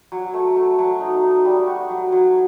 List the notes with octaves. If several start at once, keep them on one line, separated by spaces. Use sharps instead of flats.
F#3
A3
A3
F#3
D#4
D#4
G3
F#4
F#3
F#3